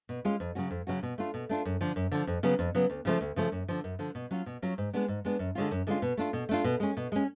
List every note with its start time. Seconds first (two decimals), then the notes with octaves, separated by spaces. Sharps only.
0.09 B2
0.25 G#3 C#4 F4
0.40 F2
0.55 C#3 F#3 C#4 F#4
0.71 F2
0.87 C#3 F#3 C#4 F#4
1.03 B2
1.18 A3 D4 F4
1.34 B2
1.49 A3 D4 F4
1.65 F#2
1.81 D3 F3
1.96 F#2
2.12 D3 F3
2.27 F2
2.43 C#3 F#3 B3
2.59 F2
2.75 C#3 F#3 B3
2.90 D2
3.05 C#3 F3 A3
3.21 D2
3.36 C#3 F3 A3
3.52 F#2
3.68 D3 F3
3.84 F#2
3.99 D3 F3
4.15 B2
4.31 F#3 C#4 F4
4.46 B2
4.62 F#3 C#4 F4
4.78 G#2
4.93 G#3 B3 D4
5.08 G#2
5.25 G#3 B3 D4
5.39 F#2
5.55 D3 G#3 C#4 F4
5.71 F#2
5.87 D3 G#3 C#4 F4
6.02 B2
6.17 A3 D4 F4
6.33 B2
6.49 A3 D4 F4
6.64 B2
6.80 G#3 C#4
6.97 B2
7.12 G#3 C#4